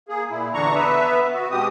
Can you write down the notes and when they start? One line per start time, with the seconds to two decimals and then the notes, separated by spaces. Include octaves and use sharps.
0.09 A#3 G#4
0.30 A#2 E4
0.54 E2 D3 E3 D4 A#5 C#6
0.75 B3 B4 E5
1.34 F#4
1.51 B2 G#3 C4 G4 D#6